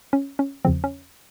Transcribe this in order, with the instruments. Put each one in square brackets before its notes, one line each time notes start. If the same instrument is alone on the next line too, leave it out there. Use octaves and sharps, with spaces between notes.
[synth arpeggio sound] C#4
C#4
E2 C#3 F3 C4
C#4